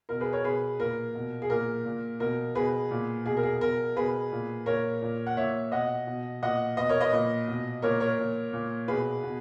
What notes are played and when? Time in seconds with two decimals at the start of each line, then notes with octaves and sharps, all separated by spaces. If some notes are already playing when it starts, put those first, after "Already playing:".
0.09 B2 A#4
0.20 G#4 B4
0.33 A#4 C#5
0.44 B2 G#4 B4
0.79 A#2 A#4
1.15 B2
1.42 G#4
1.50 A#2 A#4
1.85 A#2
2.20 B2 A#4
2.55 B2 G#4 B4
2.91 A#2
3.26 B2 G#4
3.37 A#4
3.43 G#4
3.61 B2 A#4
3.96 B2 G#4 B4
4.32 A#2
4.66 A#2 A#4 C#5
5.02 A#2
5.27 F#5
5.37 A#2 C#5 E5
5.72 B2 D#5 F#5
6.07 B2
6.43 A#2 D#5 F#5
6.77 B2 B4 D#5
6.89 A#4 C#5
7.01 B4 D#5
7.13 A#2
7.47 B2
7.82 A#2 A#4 C#5
8.00 A#4 C#5
8.18 A#2
8.53 A#2
8.88 B2 G#4 B4
9.23 B2